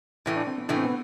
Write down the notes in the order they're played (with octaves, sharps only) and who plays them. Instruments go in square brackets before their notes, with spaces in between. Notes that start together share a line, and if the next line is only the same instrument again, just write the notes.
[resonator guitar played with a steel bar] A2 E3 A3
[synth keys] D4
C4
B3
[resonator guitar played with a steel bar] A2 E3 A3 [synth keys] D4
[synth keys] C4
B3